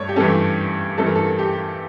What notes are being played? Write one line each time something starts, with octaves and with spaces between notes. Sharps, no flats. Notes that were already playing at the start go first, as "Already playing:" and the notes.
Already playing: G2 A3 C#5 D5
G4
G2 E3 A3 C#4 A4
G2 E3 A3 C#4 A4
A#4
A4
G4